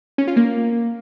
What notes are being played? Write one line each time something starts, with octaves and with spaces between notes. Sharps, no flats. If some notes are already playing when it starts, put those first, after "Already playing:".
C#4
F4
A#3